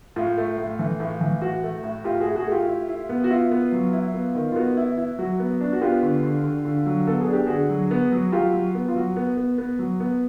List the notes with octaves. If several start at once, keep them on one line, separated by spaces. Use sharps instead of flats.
A2 F4
A3
A2
E3
A2
E3
A2 F#4
A3
A2
A2 F4 G4
F#4 G#4
A2
F#4 G#4
A3
F4 G4
E4
E4
B3
F#4
E4 F4
B3
F#3
E4
B3
D#3
F4
B3 F#4
E4
E4
F#3 F#4
B3
D4
F#4
B3 F4 G4
D3
D3
D3
D3
F#3
B3 A4
G#4
D4
G4
D3 F#4 G#4
F#3
B3
F#3
F#3 F4 G4
F#3
B3
F4
F#3 F#4
B3
B3
B3
F#3
B3